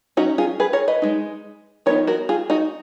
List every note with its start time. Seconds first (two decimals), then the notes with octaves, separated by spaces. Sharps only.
0.17 F#3 C#4 D#4 F#4
0.38 F4 G#4
0.60 G#4 B4
0.73 A#4 C#5
0.88 B4 D#5
1.02 G#3 D#4
1.86 F3 B3 D#4 A#4 C#5
2.07 F#4 A#4
2.29 F4 G#4
2.50 D#4 F#4